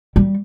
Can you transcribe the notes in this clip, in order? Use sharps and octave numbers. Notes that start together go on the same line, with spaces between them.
G3